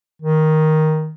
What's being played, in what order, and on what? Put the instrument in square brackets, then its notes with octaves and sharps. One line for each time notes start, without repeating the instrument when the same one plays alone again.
[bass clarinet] D#3